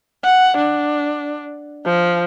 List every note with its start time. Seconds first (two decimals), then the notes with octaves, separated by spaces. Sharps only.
0.24 F#5
0.57 D4
1.85 F3